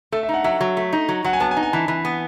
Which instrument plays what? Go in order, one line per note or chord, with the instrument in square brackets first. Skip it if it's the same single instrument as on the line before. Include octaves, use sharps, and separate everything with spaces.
[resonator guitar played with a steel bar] A3 [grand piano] A4
[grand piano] E5
[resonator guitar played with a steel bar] D#4
[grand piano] F#5
[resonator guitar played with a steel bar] F#3 [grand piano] E5
[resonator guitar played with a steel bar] F#3
A3
D#4
F#3
[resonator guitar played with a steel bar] F#3 [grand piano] F#5
[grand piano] G#5
[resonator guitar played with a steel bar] B3 [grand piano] A5
[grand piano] G#5
[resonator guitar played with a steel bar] D#4
[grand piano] G#5
[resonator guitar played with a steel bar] E3 [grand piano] A5
[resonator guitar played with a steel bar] E3
B3